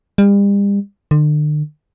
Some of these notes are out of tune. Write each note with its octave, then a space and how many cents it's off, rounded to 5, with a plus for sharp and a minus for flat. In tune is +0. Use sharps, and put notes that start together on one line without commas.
G3 +40
D3 +40